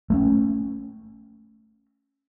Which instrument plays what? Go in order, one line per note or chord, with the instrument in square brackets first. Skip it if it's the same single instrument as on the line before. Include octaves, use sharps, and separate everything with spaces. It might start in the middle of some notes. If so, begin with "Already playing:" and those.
[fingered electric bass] A3 A#3 C#4